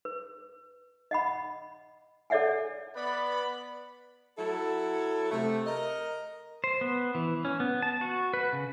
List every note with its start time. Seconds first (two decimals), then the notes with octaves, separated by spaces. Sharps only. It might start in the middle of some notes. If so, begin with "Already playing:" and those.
0.05 B4
1.11 D#5 F#5 B5
2.30 A4 C#5 D5 E5 F#5 G#5
2.95 B3 B4 D5 B5
4.38 F#3 E4 A4
5.32 C3 A3
5.66 A#4 D#5
6.64 C5
6.81 B3
7.15 E3
7.45 C#4
7.60 B3
7.82 A5
8.01 F#4
8.34 B4
8.53 C#3